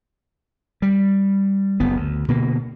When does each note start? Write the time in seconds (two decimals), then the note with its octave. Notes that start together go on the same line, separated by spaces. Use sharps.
0.82 G3
1.80 F#1 B3
1.97 D2
2.28 B2 D3 A#3